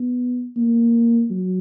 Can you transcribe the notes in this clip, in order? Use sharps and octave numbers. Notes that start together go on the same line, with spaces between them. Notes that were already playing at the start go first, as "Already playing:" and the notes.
Already playing: B3
A#3
F#3